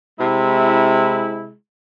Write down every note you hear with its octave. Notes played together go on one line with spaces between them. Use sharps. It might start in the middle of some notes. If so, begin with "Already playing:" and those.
C3 G#3 E4